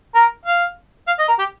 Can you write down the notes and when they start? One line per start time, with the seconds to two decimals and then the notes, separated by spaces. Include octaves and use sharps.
0.15 A#4
0.46 F5
1.07 F5
1.19 D#5
1.28 A#4
1.39 G4